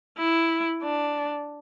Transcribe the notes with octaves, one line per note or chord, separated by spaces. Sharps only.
E4
D4